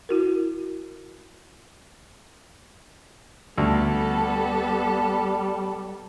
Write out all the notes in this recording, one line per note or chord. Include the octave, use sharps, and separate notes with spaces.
E4 F#4 A#4
D2 G3 B3 A4